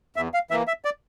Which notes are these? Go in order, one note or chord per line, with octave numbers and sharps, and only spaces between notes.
E2 E5
F5
E3 A#3 E5
E5
D5